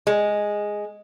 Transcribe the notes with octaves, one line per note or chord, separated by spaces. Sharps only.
G#3